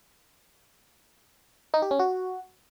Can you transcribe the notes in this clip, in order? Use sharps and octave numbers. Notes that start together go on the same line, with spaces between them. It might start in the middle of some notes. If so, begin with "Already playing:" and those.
D#4
G4
C#4
F#4